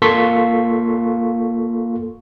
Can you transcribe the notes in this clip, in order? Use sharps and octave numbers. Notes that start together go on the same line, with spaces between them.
A#3 F4 A4 C6 C#6 B6